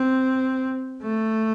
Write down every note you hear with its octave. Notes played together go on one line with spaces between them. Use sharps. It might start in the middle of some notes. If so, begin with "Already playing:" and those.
Already playing: C4
A3